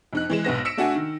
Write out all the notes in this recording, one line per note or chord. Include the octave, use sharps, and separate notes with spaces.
F2 D#4 F#6
E3 G#3 E7
B1 G#2 B3 A#6
E6 B6 C#7 D7 E7
A3 D4 F#4 F#5 G#5
D#3